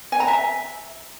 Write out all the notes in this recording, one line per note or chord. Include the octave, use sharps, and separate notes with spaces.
G#5
A#5
E5